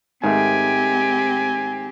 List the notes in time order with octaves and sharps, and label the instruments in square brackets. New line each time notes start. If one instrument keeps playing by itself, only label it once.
[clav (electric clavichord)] G#2 D#3 A3 [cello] C4 G4 [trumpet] G#5